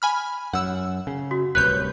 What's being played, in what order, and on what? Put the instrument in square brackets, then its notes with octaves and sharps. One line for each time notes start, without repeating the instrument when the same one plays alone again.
[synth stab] G#5 B5 F6
[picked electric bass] F#2 [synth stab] F#5 E6
[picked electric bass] C#3
[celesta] F#4
[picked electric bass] D1 C2 [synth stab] B4 C#5 G6 [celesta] F#6